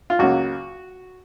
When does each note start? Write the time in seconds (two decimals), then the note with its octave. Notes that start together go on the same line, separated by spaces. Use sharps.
0.10 F4
0.19 C#2 C#3 F#3 A#3 F#4